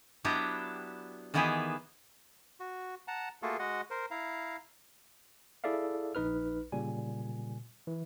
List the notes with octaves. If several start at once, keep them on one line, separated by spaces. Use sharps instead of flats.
F#3 B3 D4 E4 G4 A#5
D#3 E3 B3 E4 G4 G#4
F#4
F#5 A5 A#5
A3 A#3 F4 F#4 G#4 A4
G#3 F#4 D#5 F#5
A#4 C5
E4 F5 A#5
E4 G#4 A4 D5 E5 F5
A#1 D#4 B4 F6
A#2 C#3 G3 G#5
E3